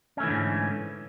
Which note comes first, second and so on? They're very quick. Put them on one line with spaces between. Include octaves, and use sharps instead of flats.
C#4 A3 E3 D3 G#2